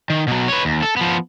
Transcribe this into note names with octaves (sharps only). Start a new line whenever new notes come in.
D#3
B2 F#3
B4 C#5
D#2
A4
F3 B3